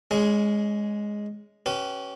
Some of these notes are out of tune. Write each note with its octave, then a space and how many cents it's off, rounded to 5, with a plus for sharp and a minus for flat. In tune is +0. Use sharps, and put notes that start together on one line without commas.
G#3 +0 C#4 +30 G#4 +0
C#4 +0 G4 -30 B4 +0